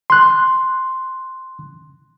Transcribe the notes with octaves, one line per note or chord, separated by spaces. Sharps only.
C6 F#6